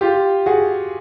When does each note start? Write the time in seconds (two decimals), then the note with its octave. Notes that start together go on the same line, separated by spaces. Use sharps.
0.01 F4 G4
0.46 F#4 G#4